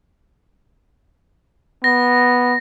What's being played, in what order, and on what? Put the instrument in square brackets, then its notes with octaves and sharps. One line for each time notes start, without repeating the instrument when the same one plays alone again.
[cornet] B3 [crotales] A#6